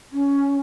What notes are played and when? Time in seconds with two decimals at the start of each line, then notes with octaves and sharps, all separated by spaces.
0.13 C#4